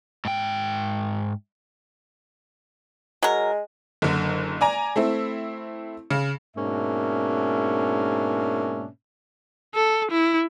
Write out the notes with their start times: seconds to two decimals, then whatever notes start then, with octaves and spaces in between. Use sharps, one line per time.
0.25 G#2 G5
3.23 F#3 G#3 A#4
4.02 F#1 D3
4.61 D5 G#5 A#5
4.96 A3 C4 E4
6.11 C#3
6.57 G#2 B2 A#3 C#4 D4 E5
9.75 A4
10.11 E4